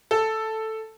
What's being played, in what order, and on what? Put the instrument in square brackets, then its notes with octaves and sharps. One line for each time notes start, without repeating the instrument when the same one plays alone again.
[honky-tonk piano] A4